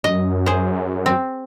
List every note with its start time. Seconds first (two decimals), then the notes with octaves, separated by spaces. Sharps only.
0.04 F#2 D#5
0.46 G#4 C5
1.06 C4